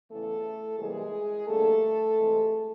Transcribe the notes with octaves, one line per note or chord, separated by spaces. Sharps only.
E2 C#3 E3 A3 A4
C3 E3 G3 G#3 A#3 G#4
F2 D3 G3 A3 A#3 A4
C3 E3 G#3 C4